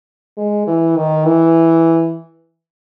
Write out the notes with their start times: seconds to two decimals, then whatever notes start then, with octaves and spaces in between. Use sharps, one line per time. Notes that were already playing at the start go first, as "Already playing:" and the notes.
0.38 G#3
0.67 E3
0.97 D#3
1.25 E3